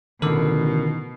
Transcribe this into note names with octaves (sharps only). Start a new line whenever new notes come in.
A1 B2 D3 D#3 A#4